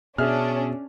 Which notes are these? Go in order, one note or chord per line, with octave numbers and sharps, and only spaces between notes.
B2 C#4 D4 G#4 E5 F6